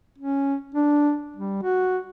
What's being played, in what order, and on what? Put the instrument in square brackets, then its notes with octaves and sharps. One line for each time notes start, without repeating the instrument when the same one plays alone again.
[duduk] C#4
D4
G3
F#4